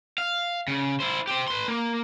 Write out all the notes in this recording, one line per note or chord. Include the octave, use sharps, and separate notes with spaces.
F5
C#3
E4 C5
G4 C5
B4 C6
A#3